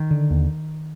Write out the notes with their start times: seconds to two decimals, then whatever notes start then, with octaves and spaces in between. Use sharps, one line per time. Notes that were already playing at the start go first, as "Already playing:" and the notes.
Already playing: D#3
0.11 D3
0.30 D#2